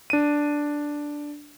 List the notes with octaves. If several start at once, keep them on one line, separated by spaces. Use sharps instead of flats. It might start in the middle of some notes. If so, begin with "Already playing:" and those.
D4 D#7